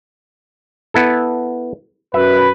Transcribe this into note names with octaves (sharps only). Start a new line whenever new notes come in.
B3 E4 A4
F#2 B4 E5